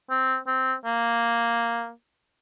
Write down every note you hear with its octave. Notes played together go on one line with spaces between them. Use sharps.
C4
C4
A#3